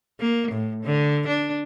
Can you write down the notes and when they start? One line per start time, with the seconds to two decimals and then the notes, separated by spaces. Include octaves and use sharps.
0.20 A#3
0.51 A2
0.84 D3
1.27 D4